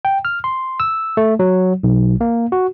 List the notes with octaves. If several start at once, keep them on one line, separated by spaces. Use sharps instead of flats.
G5
F6
C6
E6
A3
F#3
B1
A#3
F#4